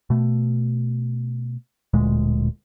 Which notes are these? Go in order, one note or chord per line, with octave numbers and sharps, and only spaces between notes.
B2 A3
D1 D2 A#2 G#3